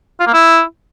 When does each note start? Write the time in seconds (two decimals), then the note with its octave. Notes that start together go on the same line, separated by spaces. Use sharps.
0.20 F4
0.27 A#3
0.34 E4